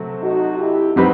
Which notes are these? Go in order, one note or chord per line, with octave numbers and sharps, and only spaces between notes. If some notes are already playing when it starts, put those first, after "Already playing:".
Already playing: C3 F#3 A3 C4
D#4 F#4
E4 G4
F#3 C4 D#4 G4 B4